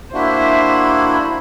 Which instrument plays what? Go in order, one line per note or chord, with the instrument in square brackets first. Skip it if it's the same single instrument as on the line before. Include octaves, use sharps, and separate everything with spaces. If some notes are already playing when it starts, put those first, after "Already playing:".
[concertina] A#3 D4 F#4 [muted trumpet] E4 [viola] C5 [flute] E5
[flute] B5